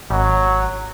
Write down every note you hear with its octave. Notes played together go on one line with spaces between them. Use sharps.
G#1 F#3